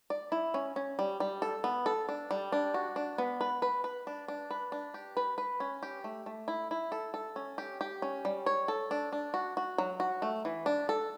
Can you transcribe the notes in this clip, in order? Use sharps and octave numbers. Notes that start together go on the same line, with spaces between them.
D5
E4
C#4
C#4
G3
G3
A4
B3
A4
D4
G3
D4
F#4
D4
B3
B4
B4
B4
D4
D4
B4
D4
G4
B4
B4
C#4
G4
A3
A3
E4
E4
A4
A4
C#4
G4
G4
C#4
G3
C#5
A4
D4
D4
F#4
F#4
F#3
F#4
A3
E3
D4
A4